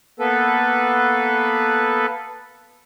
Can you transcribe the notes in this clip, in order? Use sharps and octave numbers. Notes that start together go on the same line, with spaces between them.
A#3 B3 A4 B4